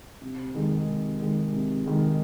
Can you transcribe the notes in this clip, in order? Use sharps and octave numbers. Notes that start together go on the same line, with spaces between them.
C3
D#3 G#3
C3
D#3 G#3
C3
D#3 G#3